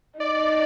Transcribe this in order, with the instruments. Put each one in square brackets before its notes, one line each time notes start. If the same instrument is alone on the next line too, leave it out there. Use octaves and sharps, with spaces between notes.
[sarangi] D#4 [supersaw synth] D5